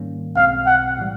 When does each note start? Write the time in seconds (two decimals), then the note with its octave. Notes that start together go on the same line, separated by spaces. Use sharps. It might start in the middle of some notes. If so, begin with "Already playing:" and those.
Already playing: G#2 D#3 G3 A#3 C#4
0.36 B1 B2 G#3 C4 F5
0.67 F#5
0.97 A2 E3 G3